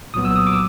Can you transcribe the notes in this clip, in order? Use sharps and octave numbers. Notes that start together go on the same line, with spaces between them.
C2 A#2 F#3 B3 D#6
E6
D#6
D6
E6